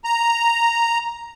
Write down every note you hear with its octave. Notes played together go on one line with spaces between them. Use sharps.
A#5